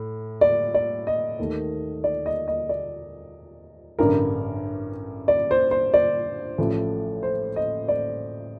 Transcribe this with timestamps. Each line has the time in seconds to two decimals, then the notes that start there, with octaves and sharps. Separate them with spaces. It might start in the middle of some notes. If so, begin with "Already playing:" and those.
Already playing: A2
0.41 D5
0.74 D5
1.07 D#5
1.39 D#2 D#3 A3
2.04 D5
2.26 D#5
2.48 D#5
2.69 D5
3.99 A1 G2 D3 A#4
5.28 D5
5.51 C5
5.71 C5
5.94 D5
6.58 A1 A2 F3 A3
7.23 C5
7.56 D#5
7.88 D5